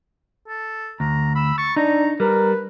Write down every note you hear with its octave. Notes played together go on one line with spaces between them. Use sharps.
A4
D2 A#5
B5 E6
C#6 A6
D4 D#4 A#5
G3 A#4 B4